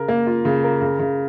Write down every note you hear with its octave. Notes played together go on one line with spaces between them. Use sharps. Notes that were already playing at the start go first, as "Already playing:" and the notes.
Already playing: C#3 A#4
A#3
F4
C#3
A#4
C#3
C#3